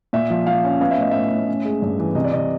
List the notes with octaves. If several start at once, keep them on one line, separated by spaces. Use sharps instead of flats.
A#2 E5
F3
F3 F5
C#4
B3 F5
E5
A2 D#5
A2 E5
A2
C#4
G#3
G2
E3
C3 D#5
D5
C3 D#5